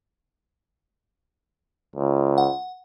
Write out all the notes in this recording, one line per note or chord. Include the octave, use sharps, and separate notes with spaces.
C#2
F#5